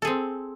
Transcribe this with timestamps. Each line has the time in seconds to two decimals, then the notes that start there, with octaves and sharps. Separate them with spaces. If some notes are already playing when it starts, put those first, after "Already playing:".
0.02 A4
0.05 G#4
0.07 C4